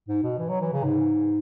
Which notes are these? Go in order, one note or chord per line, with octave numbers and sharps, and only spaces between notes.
G#2
B2
E3
F#3
E3
C#3
G#2